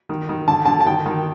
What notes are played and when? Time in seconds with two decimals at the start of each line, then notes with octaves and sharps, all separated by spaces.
0.09 D#3
0.29 D#3
0.47 D3 A5
0.65 D3 A5
0.80 A5
0.87 D#3 G5
1.06 D#3